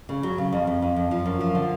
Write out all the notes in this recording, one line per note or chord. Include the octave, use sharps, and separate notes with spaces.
C#3
F#3
C#3
F2
F2
F2
F2
F3
F#2
F3
D3